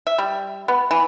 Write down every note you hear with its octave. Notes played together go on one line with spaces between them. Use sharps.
E5
G3
B3
E3